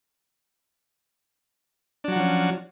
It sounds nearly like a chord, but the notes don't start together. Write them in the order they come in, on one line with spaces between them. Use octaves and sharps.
D4 F#3 F#4 F3 C#4